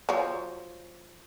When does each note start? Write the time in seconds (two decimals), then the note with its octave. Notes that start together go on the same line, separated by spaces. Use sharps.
0.09 F3 F#3